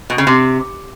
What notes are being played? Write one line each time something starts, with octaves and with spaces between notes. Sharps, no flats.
B2
C#3
C3